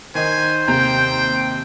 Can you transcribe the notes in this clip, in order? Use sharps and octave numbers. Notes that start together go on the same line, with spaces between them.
D#3 D#4 C5 G#5
D#2 C3 G5 A#5